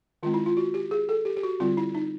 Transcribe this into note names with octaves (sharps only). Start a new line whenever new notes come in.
D#3 G#3 C4 F4
E4
F4
F#4
G4
G#4
A4
G4
G4
F#4
D3 G3 C4 F4
E4
D#4